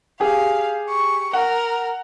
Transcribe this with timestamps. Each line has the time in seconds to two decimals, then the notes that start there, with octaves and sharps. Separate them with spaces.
0.20 G4 G#4 F5
0.89 C#6
1.33 A#4 F#5